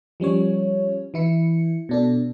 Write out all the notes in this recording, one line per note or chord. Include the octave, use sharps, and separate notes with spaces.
F3 G3 C#4 C#5
E3 E4 C#7
B2 D4 A4